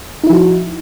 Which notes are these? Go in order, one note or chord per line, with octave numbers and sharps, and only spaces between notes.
F3 D#4 E4 F#4